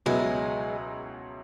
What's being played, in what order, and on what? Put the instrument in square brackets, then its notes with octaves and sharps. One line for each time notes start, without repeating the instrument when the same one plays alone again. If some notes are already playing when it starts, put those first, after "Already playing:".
[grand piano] C#2 B2 F#3 B3 E4 [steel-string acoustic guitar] G#3